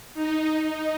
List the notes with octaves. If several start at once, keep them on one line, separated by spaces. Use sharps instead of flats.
D#4
D#4